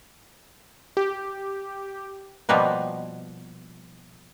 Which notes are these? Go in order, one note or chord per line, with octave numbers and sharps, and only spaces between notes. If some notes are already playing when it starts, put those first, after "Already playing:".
G4
B2 F3 G3 A#3 B4